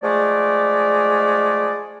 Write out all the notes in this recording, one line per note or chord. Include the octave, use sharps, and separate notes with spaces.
F3 G#3 A3 D5